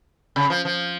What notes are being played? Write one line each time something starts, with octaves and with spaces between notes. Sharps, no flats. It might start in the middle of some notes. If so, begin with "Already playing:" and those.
C#3
F3
F3